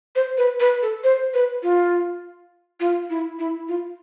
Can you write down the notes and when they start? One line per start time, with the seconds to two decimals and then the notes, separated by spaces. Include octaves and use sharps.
0.16 C5
0.38 B4
0.60 B4
0.82 A4
1.04 C5
1.34 B4
1.63 F4
2.80 F4
3.10 E4
3.39 E4
3.68 F4